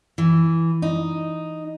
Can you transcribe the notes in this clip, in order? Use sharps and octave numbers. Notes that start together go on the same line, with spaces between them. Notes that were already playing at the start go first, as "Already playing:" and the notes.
E3
D#4